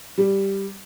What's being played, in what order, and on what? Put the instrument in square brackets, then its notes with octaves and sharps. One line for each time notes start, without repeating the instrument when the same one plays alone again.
[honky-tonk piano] G3